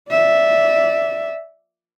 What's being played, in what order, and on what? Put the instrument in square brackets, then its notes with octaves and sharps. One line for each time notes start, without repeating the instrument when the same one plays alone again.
[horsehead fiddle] D5 E5